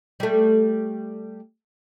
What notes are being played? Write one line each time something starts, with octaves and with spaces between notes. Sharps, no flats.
G3 A3